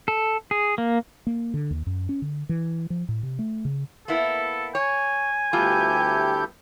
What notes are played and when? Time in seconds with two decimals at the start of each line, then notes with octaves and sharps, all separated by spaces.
0.08 A4
0.51 G#4
0.78 A#3
1.27 A#3
1.54 D3
1.71 D#2
1.87 F#2
2.09 C#4
2.22 D3
2.49 E3
2.90 F3
3.09 A2
3.23 C3
3.39 A3
3.65 C#3
4.08 A#3 B3 E4 A4
4.75 C#5 G#5
5.53 D2 G3 B3 E4 F4 G4 A4 G6